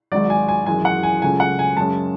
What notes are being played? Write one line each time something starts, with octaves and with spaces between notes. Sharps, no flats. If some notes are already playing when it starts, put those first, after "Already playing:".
G#1 G#2 F#3 D5
G#5
G#5
G#1 F#2 E3 G#3 G#5
F#5
G#5
C#2 C#3 F#3 A3 C#4 G#5
F#5
G#5
F#2 C#3 G#3 C#4 A5